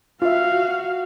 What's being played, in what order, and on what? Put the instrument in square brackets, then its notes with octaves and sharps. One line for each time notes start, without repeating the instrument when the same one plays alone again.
[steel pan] F4 E5 [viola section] F#4 [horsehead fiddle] F5